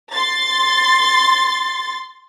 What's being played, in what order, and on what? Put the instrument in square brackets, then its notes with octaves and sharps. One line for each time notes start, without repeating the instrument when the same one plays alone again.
[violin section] C6 A6